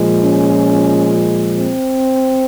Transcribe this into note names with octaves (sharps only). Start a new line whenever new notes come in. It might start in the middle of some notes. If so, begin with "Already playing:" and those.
Already playing: A#2 F3 G#3
C#4
C4